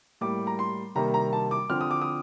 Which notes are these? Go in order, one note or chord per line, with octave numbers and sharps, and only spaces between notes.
A2 G3 A#3 D6
A#5
C6
C3 D#3 G3 A#3 A#5
A#5
A5
D6
D3 F3 C4 F6
D#6
D6
D#6